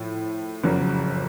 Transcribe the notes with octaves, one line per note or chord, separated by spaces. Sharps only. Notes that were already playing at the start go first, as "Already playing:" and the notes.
Already playing: A2 F3 A3
F#1 F2 C#3 F#3